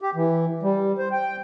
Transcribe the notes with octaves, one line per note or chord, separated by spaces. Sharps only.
G4
E3
G3
C5
G5